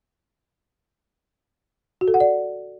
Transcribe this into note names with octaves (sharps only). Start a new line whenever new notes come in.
F#4
A4
F#5
D5